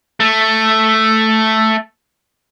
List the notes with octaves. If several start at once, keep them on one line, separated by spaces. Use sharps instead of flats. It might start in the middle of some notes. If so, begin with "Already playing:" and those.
A3